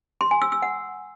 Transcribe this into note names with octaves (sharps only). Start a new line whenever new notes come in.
C6
G#5
E6
E6
F#5